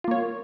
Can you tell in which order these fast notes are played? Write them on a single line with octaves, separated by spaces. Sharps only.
F4 A#3 C#5